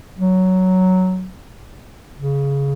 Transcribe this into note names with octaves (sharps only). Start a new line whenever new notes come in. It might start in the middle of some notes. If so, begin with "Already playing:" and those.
F#3
C#3